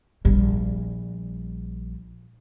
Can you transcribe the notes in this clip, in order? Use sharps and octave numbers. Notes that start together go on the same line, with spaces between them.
A#1 G3